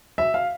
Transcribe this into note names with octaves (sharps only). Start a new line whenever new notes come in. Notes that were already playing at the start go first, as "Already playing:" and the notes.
E5
F5